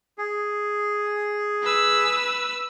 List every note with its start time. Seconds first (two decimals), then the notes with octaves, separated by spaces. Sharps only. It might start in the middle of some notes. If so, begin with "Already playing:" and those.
0.18 G#4
1.63 B4 E6